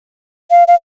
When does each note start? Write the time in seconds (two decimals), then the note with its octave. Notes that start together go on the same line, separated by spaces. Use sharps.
0.51 F5
0.68 F5